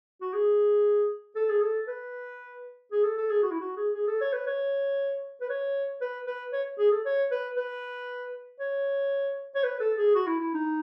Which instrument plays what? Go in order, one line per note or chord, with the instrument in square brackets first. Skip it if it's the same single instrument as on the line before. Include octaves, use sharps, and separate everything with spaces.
[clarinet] F#4
G#4
A4
G#4
A4
B4
G#4
A4
A4
G#4
F#4
E4
F#4
G#4
G#4
A4
C#5
B4
C#5
B4
C#5
B4
B4
C#5
G#4
A4
C#5
B4
B4
C#5
C#5
B4
A4
G#4
F#4
E4
E4
D#4